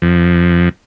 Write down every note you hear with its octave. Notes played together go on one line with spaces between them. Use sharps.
F2